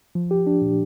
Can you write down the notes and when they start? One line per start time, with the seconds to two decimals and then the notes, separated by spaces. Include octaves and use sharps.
0.15 F3
0.31 G4
0.47 D4
0.62 A#2